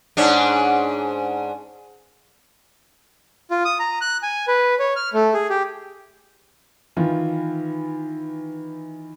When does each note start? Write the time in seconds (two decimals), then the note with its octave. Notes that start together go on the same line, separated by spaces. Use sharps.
0.17 G#2 C#4 D4
3.51 F4
3.65 D#6
3.80 A#5
4.01 F#6
4.23 G#5
4.48 B4
4.79 C#5
4.96 F6
5.14 A3
5.34 G#4
5.50 G4
6.97 D#3 E3 F4